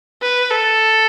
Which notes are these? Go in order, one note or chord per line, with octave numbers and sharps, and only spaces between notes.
B4
A4